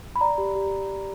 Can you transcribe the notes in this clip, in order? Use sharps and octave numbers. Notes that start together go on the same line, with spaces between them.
B5
D5 A#5
G4
G4